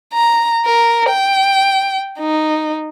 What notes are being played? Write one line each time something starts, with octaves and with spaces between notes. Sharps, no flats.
A#5
A#4
G5
D#4